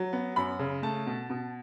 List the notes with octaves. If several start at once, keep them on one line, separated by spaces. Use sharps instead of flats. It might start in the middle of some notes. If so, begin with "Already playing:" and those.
Already playing: F#3
B3
F#2 B5
C#3
A3 A5
B2
B2